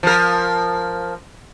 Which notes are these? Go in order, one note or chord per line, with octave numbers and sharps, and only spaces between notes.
F3 A#4